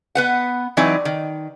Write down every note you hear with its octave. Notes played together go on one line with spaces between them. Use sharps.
B3 B4 F#5
E3 F#3 C4 D#4 B4 D5
D#3